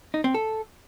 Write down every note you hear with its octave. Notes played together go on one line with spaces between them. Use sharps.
D#4
C4
A4